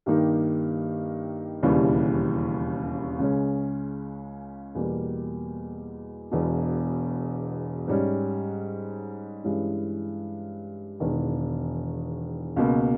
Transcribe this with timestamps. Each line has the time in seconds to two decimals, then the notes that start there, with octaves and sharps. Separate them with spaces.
0.06 G2 D#3 A#3 D#4 G4
1.63 E1 D#2 C#3 E3 G3
3.18 C#2 C#3 G#3 C#4
4.75 E2 B2 G3 A#3
6.31 E1 E2 B2
7.88 G#2 G3 C#4
9.44 G2 E3 G#3 C#4 E4
11.00 E1 E2 D#3
12.56 C#2 B2 A#3